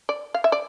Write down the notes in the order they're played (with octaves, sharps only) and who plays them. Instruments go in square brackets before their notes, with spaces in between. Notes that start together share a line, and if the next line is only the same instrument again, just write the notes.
[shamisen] D5
F5
E5
D5